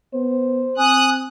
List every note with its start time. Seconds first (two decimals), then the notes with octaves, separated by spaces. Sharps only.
0.14 B3 C5
0.78 C4 G#5 D#6 F#6